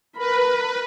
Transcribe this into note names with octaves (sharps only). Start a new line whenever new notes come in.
A#4 B4 B5